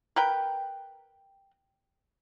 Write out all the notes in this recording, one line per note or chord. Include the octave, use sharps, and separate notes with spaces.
A#4 B4 G5